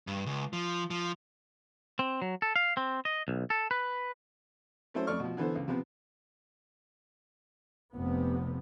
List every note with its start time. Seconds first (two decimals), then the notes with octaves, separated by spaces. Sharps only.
0.07 G2
0.26 C#2
0.53 F3
0.90 F3
1.99 C4
2.22 F#3
2.42 A4
2.56 F5
2.77 C4
3.05 D#5
3.28 B1
3.50 A4
3.71 B4
4.94 F#3 A3 C#4 E4 A4 C5
5.07 F2 A3 D5 C#6 F6
5.20 B2 F3
5.37 D3 E3 B3 A4 C5
5.55 C#2
5.68 C3 F3 B3 C4
7.94 F1 C3 B3